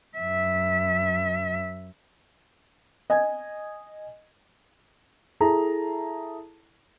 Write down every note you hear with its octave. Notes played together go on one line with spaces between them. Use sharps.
F#2 E5
D#5 G#5 G#6
E4 G#4 A4 A5 A#5